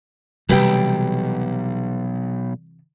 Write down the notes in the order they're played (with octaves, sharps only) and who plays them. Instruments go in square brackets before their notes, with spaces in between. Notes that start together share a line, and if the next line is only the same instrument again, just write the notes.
[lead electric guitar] B1 [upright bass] C3 E3 [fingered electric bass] G3 [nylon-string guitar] G4 B4 G5